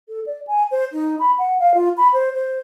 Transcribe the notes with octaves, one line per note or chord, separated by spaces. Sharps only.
A4
D5
G#5
C5
D#4
B5
F#5
F5
F4
B5
C5
C5